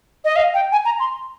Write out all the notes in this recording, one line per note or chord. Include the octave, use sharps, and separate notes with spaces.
D#5
F5
G5
G#5
A#5
C6